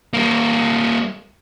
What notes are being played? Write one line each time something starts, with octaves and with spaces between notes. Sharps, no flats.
G3 A#3